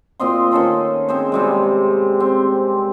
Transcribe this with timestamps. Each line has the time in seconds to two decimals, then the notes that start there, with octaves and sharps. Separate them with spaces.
0.20 A#2 C4 D#5 C6
0.51 D#3 C#4 A4 C5
1.09 C4 G#4 C5
1.32 C3 G3 G#3
2.20 C4